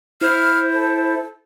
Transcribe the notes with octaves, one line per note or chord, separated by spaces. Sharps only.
E4 C5 F6
A4